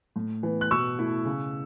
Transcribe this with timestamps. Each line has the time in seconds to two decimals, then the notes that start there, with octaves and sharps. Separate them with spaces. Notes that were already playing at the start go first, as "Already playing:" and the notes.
0.16 A2
0.43 E3 B3
0.61 F#6
0.71 B2 C#6 E6
0.99 A3 E4
1.25 C#3